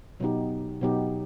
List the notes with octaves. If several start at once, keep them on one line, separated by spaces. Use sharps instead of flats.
B2 F#3 B3 D#4 G4
B2 F#3 B3 D#4 G4